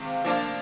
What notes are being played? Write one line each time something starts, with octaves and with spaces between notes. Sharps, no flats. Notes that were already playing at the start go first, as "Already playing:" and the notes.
Already playing: C3 D#3 G#3 F4
F3 A#3 D4 F4